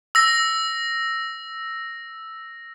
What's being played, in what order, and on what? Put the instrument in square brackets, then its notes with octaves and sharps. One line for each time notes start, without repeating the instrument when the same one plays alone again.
[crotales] E6 A#6